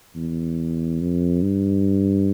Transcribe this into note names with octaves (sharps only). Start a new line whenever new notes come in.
E2
F2
G2